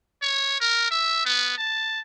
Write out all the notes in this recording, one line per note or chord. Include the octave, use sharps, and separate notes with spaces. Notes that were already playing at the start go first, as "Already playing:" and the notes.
C#5
A#4
E5
B3
A5